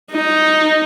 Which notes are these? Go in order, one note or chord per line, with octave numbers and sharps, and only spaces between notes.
D#4